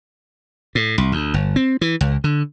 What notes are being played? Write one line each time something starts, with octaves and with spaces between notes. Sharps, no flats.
A2
C2
D2
G1
C4
E3
C#2
D3